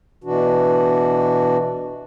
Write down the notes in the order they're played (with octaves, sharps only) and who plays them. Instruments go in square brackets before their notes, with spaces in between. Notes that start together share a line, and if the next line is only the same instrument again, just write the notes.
[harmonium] B2 E3 D4 F#4